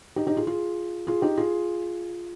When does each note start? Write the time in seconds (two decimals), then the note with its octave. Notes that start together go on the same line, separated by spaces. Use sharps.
0.16 D#4 G4
0.27 D#4 G4
0.37 F4 G#4
0.47 F4 G#4
1.07 F4 G#4
1.22 D#4 G4
1.37 F4 G#4